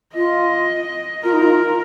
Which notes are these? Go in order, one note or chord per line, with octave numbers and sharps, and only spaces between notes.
F4 D#5
F4 A#4
D#4
F4